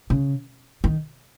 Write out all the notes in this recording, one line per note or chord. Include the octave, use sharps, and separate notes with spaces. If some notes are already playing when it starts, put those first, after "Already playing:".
C#3
D#3